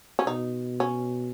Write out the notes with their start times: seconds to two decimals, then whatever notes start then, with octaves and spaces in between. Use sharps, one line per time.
0.19 C#4
0.27 B2 D#4
0.80 C#4